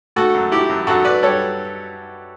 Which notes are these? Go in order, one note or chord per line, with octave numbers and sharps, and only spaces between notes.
A3 F#4 A4
F#2
E4 G4
F#2
F#2 F#4 A4
F#2 B4 D5
G3 A4 C#5